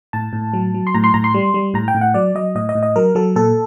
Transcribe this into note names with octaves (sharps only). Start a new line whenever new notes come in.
A2 A5
A2
F#3
F#3
C6
A2 A#5
C6
A2 A#5
C6
G3
G3
A2 A#5
G5
A2
F#5
F#3 D5
F#3 D#5
A2 D#5
D#5
A2
D#5
F#3 A#4
F#3 A4
A#2 A4